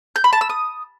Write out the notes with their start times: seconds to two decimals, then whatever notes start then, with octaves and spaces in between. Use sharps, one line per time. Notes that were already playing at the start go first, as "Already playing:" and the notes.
0.16 G6
0.24 B5
0.33 A5
0.41 E6
0.49 D#6